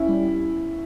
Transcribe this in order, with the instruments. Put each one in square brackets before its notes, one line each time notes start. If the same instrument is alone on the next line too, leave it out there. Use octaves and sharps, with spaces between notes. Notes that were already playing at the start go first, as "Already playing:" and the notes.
Already playing: [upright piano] C#4 E4
[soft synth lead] G3